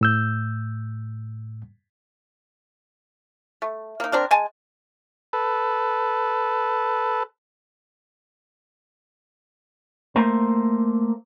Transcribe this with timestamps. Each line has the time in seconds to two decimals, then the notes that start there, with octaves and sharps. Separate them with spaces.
0.01 A2 E6 G6
3.62 A3
4.00 A#3 D#4
4.12 C4 D4 A#4
4.31 G#3 G#5 A5
5.33 A4 B4
10.16 A3 A#3 C5